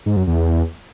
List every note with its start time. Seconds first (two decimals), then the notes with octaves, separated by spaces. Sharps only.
0.06 G#2
0.16 F#2
0.27 E2